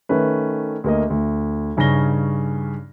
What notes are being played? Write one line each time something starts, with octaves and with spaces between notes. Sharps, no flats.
D#3 A3 C#4 B4
D2 A#3 D#5
D2
G2 C#3 C#4 D#4 A#6 G7